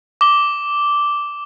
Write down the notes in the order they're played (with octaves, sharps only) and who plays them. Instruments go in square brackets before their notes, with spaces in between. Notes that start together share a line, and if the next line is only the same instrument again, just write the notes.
[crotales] D6 G7